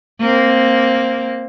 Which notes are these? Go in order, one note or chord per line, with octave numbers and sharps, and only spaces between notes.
A#3 C4